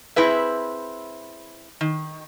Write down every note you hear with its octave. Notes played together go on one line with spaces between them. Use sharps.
C4 E4 G#4 B4 E5
D#3